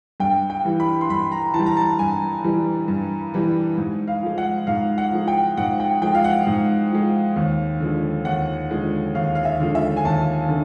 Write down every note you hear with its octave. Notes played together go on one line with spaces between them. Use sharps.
G2 G5
G5
E3 G3
B5
C6
G2 B5
A#5
E3 A5
G3
A#5
A5
G2 G#5
E3 G3
G2
E3 G3
G#2
F5
F3 G#3
F#5
G#2 F5
F#5
F3 G#3
G5
G#2 F#5
G5
F3 G#3 G5
F5
F#5
G#2
F3 G#3
D#2
D3 F3 G#3
D#2 F#5
D3 F3 G#3
D#2 F5
F5
E5
D3 F3 G#3
E5
G#5
D#2 A5
D3